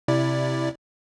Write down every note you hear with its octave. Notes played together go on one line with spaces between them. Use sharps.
C3 E4 D5